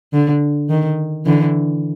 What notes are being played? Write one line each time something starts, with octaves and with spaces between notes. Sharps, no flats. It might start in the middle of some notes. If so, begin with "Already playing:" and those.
D3
D#3
D3 E3